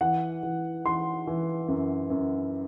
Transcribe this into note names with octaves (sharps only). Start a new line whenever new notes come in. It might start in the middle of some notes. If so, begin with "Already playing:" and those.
E3 F#5
E3
E3 C6
E3
F#2
F#2